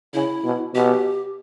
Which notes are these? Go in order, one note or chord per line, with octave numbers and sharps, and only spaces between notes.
C#3 E4
B2
B2 G4